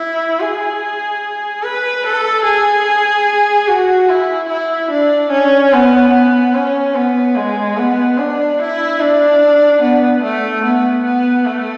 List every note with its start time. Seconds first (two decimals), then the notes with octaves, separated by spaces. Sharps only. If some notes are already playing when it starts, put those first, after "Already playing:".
Already playing: E4
0.40 G#4
1.63 B4
2.04 A4
2.45 G#4
3.68 F#4
4.09 E4
4.49 E4
4.91 D4
5.31 C#4
5.73 B3
6.13 B3
6.55 C#4
6.95 B3
7.36 G#3
7.78 B3
8.18 D4
8.59 E4
9.00 D4
9.82 B3
10.23 A3
10.64 B3
11.04 B3
11.45 A3